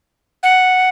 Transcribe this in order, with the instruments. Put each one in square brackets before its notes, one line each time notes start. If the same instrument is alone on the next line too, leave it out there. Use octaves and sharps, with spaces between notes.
[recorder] F#5